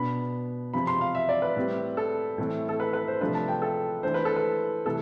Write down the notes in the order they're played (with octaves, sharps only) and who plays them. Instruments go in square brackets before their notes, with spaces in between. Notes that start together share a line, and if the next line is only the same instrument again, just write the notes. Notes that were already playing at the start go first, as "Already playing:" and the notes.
Already playing: [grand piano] B2 B3 D4 B5
C3 F3 C4 B5
C6
F5
E5
D5
B4
A2 G3 C4
A4
A2 E3 A3 C4
A4
B4
B4
C5
C3 F3 A3 D4 B4
A5
G5
A4
E3 A3 D4 C5
B4
A4
B4
C3 E3 A3 A4